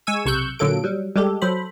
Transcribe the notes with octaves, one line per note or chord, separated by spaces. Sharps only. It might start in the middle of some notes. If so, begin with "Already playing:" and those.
G#3 G#5 C#6 E6 D#7
B1 C3 C#6 E6 F#6 G6
A#2 D3 F#3 A#3 A4 D7
F#3 G3
G3 G#3 G4 A4
F#3 A4 C5 B5